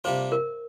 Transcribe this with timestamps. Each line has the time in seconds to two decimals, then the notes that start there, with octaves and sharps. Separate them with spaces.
0.04 C3 G3 A#3 D4 F4 C5
0.32 A#4